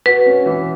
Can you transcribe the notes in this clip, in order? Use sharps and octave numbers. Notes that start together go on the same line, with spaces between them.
F#4 B4
C#4
E3